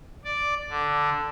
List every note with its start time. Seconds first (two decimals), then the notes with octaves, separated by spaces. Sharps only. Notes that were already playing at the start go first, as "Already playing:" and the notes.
0.25 D5
0.70 D3